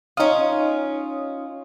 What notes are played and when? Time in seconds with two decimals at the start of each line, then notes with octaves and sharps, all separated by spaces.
0.17 C#4 D#4 F4 D#6